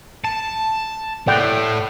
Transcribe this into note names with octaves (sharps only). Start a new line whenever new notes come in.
A5
A2 D5 F#5 G5